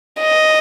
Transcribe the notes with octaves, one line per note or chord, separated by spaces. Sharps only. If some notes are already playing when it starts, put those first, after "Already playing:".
D#5